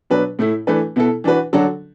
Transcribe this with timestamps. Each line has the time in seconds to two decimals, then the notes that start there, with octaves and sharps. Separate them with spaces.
0.10 B2 F#3 D4 B4
0.39 A2 A3 E4
0.67 E3 A3 D4 B4
0.96 B2 B3 E4 A4
1.24 E3 D4 F#4 B4
1.53 D3 F#3 D4 F#4 A4